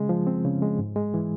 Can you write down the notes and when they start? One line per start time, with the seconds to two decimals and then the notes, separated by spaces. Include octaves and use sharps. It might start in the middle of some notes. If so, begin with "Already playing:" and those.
Already playing: C#3 G#3
0.09 F3
0.27 C4
0.45 C#3
0.62 G#3
0.79 G#2
0.96 G#3
1.14 E3